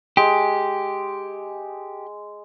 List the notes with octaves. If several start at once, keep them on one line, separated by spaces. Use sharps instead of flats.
G#3 G4